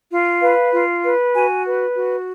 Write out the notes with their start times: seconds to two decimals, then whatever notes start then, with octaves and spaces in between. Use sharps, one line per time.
0.11 F4
0.41 B4 F5
0.73 F4
1.04 B4
1.34 F#4 G#5
1.66 B4
1.95 F#4